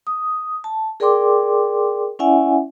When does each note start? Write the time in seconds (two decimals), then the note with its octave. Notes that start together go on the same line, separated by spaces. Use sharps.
0.07 D#6
0.64 A5
1.00 G#4 A#4 D5 G5 C6 D6
2.19 C#4 E4 D5 E5 F#5 G#5